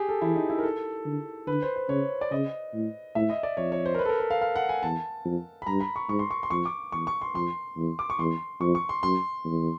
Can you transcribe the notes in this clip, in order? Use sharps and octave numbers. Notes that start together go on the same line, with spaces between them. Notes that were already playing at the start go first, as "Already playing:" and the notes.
Already playing: G4 G#4
A4
E3 E4
D#4
E4
A#4
A4
D3
D3 B4
C5
C5
C#3 C#5
D5
C#3 D#5
A2
A2 E5
D#5
D5
F2 C#5
C#5
C5
A#4
B4
A4
A#4
B4
F5
F5
F#5
G#5
E2 A5
F2
B5
G2 A#5
B5
C#6
G#2 C#6
C6
C#6
C6
F2 C#6
D6
E2 C#6
C#6
C6
F2 C6
E2
D6
C#6
E2 C6
F2 C#6
C#6
C6
F#2 C6
E2